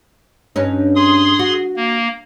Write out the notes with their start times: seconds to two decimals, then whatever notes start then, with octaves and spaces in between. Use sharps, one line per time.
0.56 G2 C#4 D#4
0.96 G#4 C6 D#6
1.39 F#4
1.76 A#3